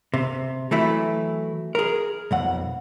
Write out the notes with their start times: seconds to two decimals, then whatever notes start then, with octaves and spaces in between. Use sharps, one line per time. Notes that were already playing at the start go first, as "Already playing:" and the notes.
0.14 C3
0.71 E3 F#3 A3 E4
1.75 G#4 A#4
2.31 B1 F2 F#5